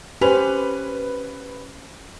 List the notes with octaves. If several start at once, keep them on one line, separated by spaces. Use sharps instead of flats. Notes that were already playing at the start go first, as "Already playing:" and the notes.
C#4 G4 B4 C5 F7